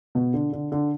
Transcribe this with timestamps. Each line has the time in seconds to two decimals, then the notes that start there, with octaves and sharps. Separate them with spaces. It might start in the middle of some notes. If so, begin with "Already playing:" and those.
0.15 B2
0.34 D3
0.52 D3
0.72 D3